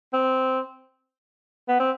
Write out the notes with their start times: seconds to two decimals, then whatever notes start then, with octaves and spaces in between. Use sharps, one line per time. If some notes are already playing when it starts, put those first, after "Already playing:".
0.13 C4
1.68 B3
1.80 C4